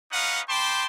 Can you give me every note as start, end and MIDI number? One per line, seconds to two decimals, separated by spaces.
0.12 0.40 61
0.12 0.40 63
0.12 0.40 71
0.12 0.40 75
0.12 0.40 77
0.12 0.40 78
0.49 0.85 72
0.49 0.85 79
0.49 0.85 81
0.49 0.85 83
0.49 0.85 84
0.49 0.85 86